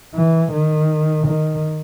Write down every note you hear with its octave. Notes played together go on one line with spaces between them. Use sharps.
E3
D#3
D#3